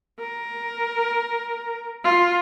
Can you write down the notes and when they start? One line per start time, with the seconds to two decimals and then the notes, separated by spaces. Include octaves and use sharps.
0.19 A#4
2.04 F4